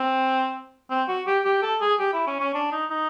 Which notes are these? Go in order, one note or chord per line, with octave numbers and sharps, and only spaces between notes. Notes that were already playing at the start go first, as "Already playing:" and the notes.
Already playing: C4
C4
F#4
G4
G4
A4
G#4
G4
E4
C#4
C#4
D4
D#4
D#4